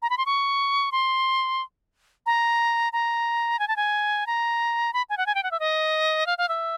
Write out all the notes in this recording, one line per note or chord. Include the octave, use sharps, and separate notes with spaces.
A#5
B5
C6
C#6
C6
A#5
A#5
G#5
A5
G#5
A#5
B5
G#5
F#5
G#5
G5
F#5
E5
D#5
F5
F5
E5